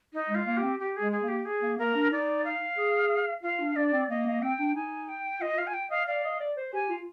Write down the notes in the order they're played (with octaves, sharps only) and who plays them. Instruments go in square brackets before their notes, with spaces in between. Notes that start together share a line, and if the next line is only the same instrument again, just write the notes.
[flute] D#4
[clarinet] G#3
[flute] F4
[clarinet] A#3
[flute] G4
[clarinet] C4
[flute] G4
[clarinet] G#3 [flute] G#4
[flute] G#4
[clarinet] A#3
[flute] G4
G#4
[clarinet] A#3
[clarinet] A#3 [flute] A#4
[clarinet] D4
[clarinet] D#4 [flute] D5
[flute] F5
[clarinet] G#4
[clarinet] F4 [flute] F5
[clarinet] D4
[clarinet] D4 [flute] D5
[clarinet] C4
[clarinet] A#3 [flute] D#5
[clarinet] A#3
[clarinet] C4 [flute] G5
[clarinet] D4
[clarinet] D#4 [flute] G#5
[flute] G5
[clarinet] F4 [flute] D#5
[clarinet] F4 [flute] F5
[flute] G#5
G5
[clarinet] D#5 [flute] F5
[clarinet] D5 [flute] F5
[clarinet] D#5
D5
C5
[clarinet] G4 [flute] G#5
[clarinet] F4